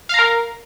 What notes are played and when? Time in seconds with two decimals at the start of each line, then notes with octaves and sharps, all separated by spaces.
0.09 F5
0.14 A#5
0.19 A#4